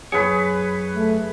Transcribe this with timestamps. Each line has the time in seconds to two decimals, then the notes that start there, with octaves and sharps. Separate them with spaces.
0.12 F#2 G#4 B4 C#5
0.95 A3